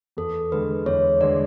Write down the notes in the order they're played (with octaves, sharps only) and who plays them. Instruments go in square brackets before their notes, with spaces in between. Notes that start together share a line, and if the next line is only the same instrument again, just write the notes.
[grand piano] E2 [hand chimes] A4
[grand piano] D3 G#3 [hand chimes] B4
[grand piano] E2 [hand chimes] C#5
[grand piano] D3 G#3 [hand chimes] D5